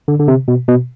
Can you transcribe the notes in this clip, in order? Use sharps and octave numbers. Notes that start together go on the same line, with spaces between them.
D3
D3
C3
B2
B2